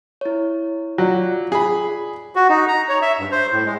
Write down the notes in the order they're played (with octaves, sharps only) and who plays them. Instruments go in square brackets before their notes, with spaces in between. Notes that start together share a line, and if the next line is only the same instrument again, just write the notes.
[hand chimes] E4 C#5
[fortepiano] F#3 [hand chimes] F4 D5
[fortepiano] G#4 B5
[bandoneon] F#4
D#4
A#5
C#5
E5
G2
C5
A2
G#3